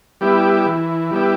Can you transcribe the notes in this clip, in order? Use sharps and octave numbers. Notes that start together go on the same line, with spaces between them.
G3 B3 E4 G4
E3
G3 B3 E4 G4